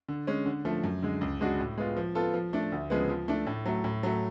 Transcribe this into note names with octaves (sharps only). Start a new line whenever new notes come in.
D3
G#3 C#4
D3
F3 A3
F#2
D3 G#3
C#2
C#3 G#3 D4 F#4
A2
G#3 B3 F4
F3
B3 F4 A4
F3
A3 D4
D2
C#3 F3 G#3 B3
F3
A3 D4
A2
F#3 A3
A2
F#3 A3